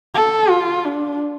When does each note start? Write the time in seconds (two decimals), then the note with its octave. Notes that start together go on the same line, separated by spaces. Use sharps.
0.14 A4
0.50 F4
0.85 D4